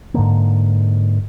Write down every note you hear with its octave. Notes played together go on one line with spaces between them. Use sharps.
G#2 D3 A#3